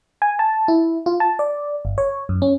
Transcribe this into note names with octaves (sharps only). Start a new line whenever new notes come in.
G#5
A5
E4
F4
A5
D5
G1
C#5
F#2
C#4